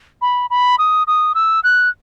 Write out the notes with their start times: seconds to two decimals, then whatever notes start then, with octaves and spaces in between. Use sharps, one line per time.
0.22 B5
0.50 B5
0.78 D#6
1.07 D#6
1.35 E6
1.64 F#6